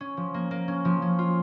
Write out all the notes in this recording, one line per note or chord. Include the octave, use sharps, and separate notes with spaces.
C#4
F3
A#3
A#3
C#4
F3
C#4
F4